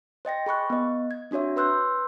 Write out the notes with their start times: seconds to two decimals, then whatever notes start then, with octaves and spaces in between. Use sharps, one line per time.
0.25 C5 D#5 G5 A#6
0.46 G#4 B5 C#6 F#6
0.70 B3 D#5
1.11 G#6
1.31 C4 D4 F#4 C#5 E5
1.56 B4 C6 E6 F#6 G6